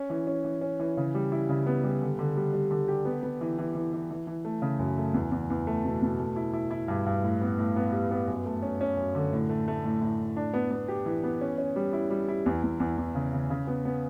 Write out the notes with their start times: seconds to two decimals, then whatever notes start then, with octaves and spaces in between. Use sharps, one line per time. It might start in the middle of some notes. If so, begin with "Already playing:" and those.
Already playing: C#4
0.10 E3
0.27 C#4
0.44 E3
0.61 C#4
0.80 E3
0.97 C#3
1.15 G3
1.32 E4
1.49 C#3
1.67 B3
1.84 G3
2.01 D3
2.19 D3
2.37 G3
2.53 G3
2.71 D3
2.88 G4
3.05 B3
3.23 B3
3.41 E3
3.59 E3
3.75 E3
3.93 E3
4.11 E3
4.27 E3
4.45 A3
4.62 C#3
4.79 F#2
4.98 A3
5.14 E2
5.31 E2
5.50 E2
5.67 A3
5.84 B2
6.02 B2
6.18 A3
6.36 E4
6.53 E4
6.71 E4
6.88 G2
7.06 G2
7.24 A2
7.41 B3
7.59 A2
7.76 B3
7.92 G3
8.11 B3
8.28 F#2
8.46 A3
8.63 C#4
8.81 C#4
8.97 F#2
9.15 D3
9.33 A2
9.49 A3
9.68 A3
9.85 A2
10.01 A2
10.19 A2
10.36 D4
10.54 B3
10.71 B3
10.88 G4
11.06 E3
11.23 B3
11.41 C#4
11.58 C#4
11.76 G3
11.93 E4
12.10 G3
12.28 E4
12.46 E2
12.64 E2
12.80 E2
12.98 E2
13.15 C#3
13.33 C#3
13.50 C#3
13.67 B3
13.85 B3